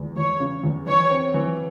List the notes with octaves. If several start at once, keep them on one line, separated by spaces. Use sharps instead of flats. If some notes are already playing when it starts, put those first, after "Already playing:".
Already playing: E2 G#3
E2 C#5
C#3
E2
E3 C#5
C4
E3